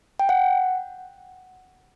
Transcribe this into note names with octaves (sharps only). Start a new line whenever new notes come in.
G5
F#5